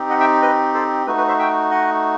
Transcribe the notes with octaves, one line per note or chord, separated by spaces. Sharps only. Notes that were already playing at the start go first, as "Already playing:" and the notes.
Already playing: C4 D#4 G4
D#5 F#5
E5 G5
B4 D#5
A4 C5
A3 D#4 F#4 B4
B4
C5 E5
E5 G5
D#5 F#5